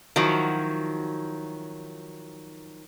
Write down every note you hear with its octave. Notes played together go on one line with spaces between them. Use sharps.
D#3 F3 F#3 E4 F#4